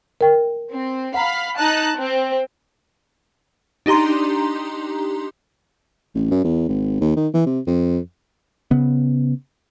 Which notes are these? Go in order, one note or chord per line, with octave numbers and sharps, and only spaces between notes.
A#4 G5
C4
F5 F#5 A#5 B5
D#4 A5 F#6
C4
D4 D#4 G4 A#5 C6
A1
F#2
E2
G#1
D#2
D#3
E3
C3
F2
C#3 B3